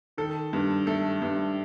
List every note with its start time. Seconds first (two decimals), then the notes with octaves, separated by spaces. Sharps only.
0.18 D#3 A4
0.53 G2
0.86 A3 A4
1.22 G2